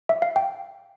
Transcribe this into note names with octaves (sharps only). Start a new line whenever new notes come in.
E5
F5
G5